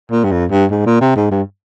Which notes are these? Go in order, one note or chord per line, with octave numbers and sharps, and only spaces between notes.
A#2
G2
F2
G2
G#2
A#2
C3
G#2
G2